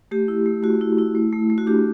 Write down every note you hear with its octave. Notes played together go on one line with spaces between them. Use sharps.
A3 G4
E4
A3
A3 F#4
E4
E4
A3
A3
A3
F#4
D4 G4